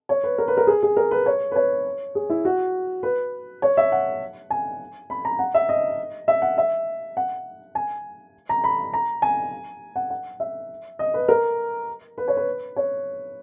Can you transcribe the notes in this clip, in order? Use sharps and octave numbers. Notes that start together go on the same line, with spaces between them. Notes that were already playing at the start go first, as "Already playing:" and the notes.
C#5
B4
A#4
B4
A#4
G#4
G#4
A#4
B4
C#5
B4
C#5
G#4
E4
F#4
B4
C#5
E5
F#5
G#5
B5
A#5
F#5
E5
D#5
E5
F#5
E5
F#5
G#5
A#5
B5
A#5
G#5
F#5
F#5
E5
D#5
B4
A#4
B4
C#5
B4
C#5